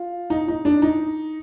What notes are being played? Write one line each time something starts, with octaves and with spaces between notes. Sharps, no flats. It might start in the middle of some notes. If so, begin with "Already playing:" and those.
Already playing: F4
D#4
D#4
D4
D#4